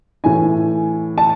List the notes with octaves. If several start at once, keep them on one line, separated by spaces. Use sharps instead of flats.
A2 E3 G#5
A5